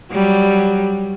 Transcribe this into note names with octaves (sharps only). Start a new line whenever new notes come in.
F#3 G3